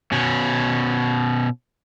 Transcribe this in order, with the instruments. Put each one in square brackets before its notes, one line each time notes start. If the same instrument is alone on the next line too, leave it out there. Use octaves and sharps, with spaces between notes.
[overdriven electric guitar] B2 C#4